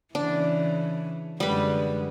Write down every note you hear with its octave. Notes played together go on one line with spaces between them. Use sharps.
C#3 E3 D4
F#2 D3 G3 G#3 B4